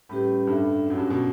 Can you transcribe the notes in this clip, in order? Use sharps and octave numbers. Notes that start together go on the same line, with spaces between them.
A2 G3 C#4 G4 B4
G2 D4 A4 E5
F#2 C#4 F#4 C#5 F#5
G2
B2